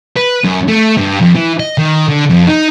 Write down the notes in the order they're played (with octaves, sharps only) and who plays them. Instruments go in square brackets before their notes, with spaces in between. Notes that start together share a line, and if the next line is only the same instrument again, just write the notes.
[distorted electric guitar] B4
F#2
A3
G2
F2
E3
D#5
D#3
D3
F2
D#4